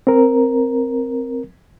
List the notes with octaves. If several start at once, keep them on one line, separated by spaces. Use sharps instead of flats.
C4 A#4